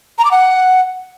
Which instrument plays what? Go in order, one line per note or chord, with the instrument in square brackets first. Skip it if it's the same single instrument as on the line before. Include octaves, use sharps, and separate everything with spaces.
[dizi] A#5
D6
F#5